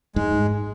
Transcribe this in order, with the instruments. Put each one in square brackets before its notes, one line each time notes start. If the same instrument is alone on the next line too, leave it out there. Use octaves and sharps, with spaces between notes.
[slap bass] G#2 [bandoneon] G#3